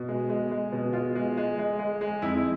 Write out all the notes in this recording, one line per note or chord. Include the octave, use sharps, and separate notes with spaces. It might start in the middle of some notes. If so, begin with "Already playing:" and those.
Already playing: B2
G#3
G#3
G#3
B2
G#3 F4
G#3
G#3
G#3
G#3
G#3
F2 E4